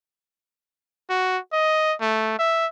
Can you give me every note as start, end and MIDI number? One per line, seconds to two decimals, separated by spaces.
1.10 1.38 66
1.53 1.94 75
2.01 2.36 57
2.39 2.66 76